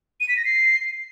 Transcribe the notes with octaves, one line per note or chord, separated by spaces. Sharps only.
D#7
B6
A#6
C7